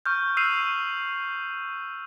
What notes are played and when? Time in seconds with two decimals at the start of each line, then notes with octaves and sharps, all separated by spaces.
0.06 C#6 F6 G6
0.37 E6 F#6 C7 D#7 F7